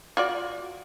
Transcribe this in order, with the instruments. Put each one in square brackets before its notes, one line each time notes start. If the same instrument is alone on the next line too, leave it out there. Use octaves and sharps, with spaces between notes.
[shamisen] F4 F#4 D5